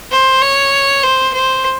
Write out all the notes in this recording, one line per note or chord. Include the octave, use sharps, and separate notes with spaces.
C5
C#5
C5
C5